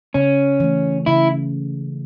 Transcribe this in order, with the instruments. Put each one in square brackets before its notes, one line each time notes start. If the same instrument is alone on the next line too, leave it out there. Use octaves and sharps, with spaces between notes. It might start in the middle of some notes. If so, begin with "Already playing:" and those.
[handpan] C#3 [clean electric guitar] C#4
[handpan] E3 A3
[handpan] C#3 [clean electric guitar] E4